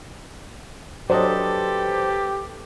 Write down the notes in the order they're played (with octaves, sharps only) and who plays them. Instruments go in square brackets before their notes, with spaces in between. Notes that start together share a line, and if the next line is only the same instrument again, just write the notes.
[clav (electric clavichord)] F#3 D4 D#5 [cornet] G4 [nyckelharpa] A4 B4 [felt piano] C5